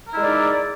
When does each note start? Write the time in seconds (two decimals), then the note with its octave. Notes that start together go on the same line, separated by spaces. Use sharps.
0.08 A#4
0.12 E4
0.17 G#3
0.22 D5
0.27 D#4